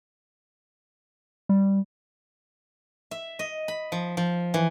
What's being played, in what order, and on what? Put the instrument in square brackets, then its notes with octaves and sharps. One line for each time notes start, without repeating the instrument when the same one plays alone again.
[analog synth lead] G3
[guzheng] E5
D#5
B5
F3
F3
E3